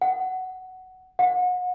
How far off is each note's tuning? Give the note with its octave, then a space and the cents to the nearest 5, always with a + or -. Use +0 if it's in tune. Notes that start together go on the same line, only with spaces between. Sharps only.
F#5 +10
F#5 -30